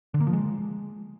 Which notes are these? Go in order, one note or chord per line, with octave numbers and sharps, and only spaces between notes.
D3
A#3
F3
G#3